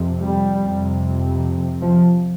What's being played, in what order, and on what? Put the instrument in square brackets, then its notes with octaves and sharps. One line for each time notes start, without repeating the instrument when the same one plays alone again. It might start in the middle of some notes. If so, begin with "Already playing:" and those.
Already playing: [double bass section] F2 C3
G3
F2 C3
F3